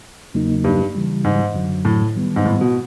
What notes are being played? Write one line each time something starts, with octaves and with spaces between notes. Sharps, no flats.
E2 C#3 F#3 A#3 D#4
G2
C#3 E3 G3
G#2
F#2 D3 F#3
A2
D#3 G3 B3
G#2
A2
B2